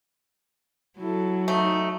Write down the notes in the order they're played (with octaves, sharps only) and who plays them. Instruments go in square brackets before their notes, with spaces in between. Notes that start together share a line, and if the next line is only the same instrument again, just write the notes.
[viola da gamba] F#3 [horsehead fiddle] E4 A4
[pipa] A3 [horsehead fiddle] D#4